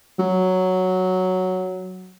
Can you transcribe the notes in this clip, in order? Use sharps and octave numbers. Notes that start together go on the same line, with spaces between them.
F#3